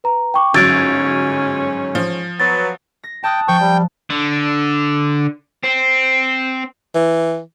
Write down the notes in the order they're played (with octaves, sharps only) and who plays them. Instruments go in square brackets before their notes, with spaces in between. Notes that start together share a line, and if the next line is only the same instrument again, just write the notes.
[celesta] B4 A#5
G5 C#6 D6
[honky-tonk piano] G1 F#3 G#6 [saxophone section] G#2 C#4 [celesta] E6 A6 D7
[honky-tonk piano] F3
[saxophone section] F#3 B3 [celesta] A6
[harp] A#6
[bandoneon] G5 [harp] A5 D#6 F#6
[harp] F3 [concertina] G5 [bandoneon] C#6
[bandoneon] G3
[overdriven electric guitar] D3
C4
[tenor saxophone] E3